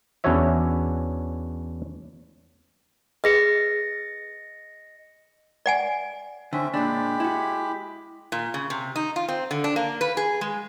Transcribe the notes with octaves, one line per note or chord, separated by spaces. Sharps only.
E2 C#4 D4 F#4 C#5 E5
G#4 B4 D#5 A#6 C#7
D5 F#5 G#5
D3 C4 C#4 E5
A#2 G#3 D4 G4 B5
E4 F#4
A#2
C#3
C3
D#4
F4
C4
D3
D4
A#3
B4
G#4
G#3